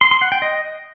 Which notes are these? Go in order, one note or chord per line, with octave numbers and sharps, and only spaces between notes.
C6
C6
F#5
G5
D#5